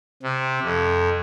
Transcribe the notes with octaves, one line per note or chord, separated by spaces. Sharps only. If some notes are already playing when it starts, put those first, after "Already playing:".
C3
F2